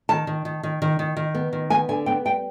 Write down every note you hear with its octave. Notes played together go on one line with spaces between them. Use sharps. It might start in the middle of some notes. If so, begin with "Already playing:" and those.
D#3 A5
D#3
D#3
D#3
D#3
D#3
D#3
B3
D#3
B3 G#5
D3 G#5
B3 G5
G3 G5